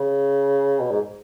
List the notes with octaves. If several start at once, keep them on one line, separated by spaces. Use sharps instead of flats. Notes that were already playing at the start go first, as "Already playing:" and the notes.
Already playing: C#3
B2
G#2